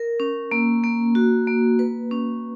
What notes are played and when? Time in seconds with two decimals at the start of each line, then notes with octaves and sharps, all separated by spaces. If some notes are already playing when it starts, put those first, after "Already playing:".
Already playing: A#4
0.20 C#4
0.52 A#3
0.84 A#3
1.15 F#4
1.47 A#3
1.79 B4
2.11 C#4